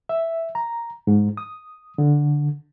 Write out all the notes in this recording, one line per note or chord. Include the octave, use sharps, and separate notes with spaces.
E5
A#5
G#2
D#6
D3